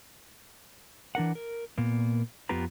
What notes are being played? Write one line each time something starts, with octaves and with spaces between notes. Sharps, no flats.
E3 D4 A#4 F#5
A#4
A#2 A#3 B3
F2 B3 F4 G4 B4 A#5